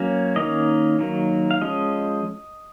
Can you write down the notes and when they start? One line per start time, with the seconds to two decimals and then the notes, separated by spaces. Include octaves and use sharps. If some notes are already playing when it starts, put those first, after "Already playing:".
Already playing: F#3 A#3 C#4
0.36 D#3 A#3 C#4 D#5
0.99 D#3 F#3 A#3
1.51 F5
1.61 F3 G#3 C#4 D#5